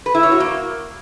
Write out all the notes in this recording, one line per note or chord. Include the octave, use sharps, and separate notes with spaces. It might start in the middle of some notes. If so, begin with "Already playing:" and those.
B4
E4
C#5
F#4
A#3